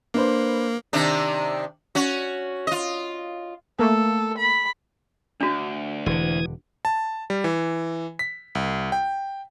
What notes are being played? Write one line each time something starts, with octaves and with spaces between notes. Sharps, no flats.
A#3 D4 B4 C5
C3 D#3 D4
C#4 F#4
F4 D#5
A3 A#3 A4
B5
D2 D4 F#4
E1 D3 E3 D#6 G#6
A5
G3
E3
B6
C2
G5